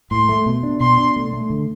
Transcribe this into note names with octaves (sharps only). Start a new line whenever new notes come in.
A2 C6
A3
B2
D4
B2 C6
D4
A3
A3
D3